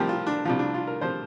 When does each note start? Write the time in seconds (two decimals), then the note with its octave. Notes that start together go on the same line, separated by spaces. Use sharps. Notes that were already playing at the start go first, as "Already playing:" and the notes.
Already playing: C2 C3 F3 G4 A#4
0.09 F4
0.27 D4
0.45 C2 C3 F3 F4
0.59 D4
0.74 F4
0.87 A#4
1.01 C3 F3 C5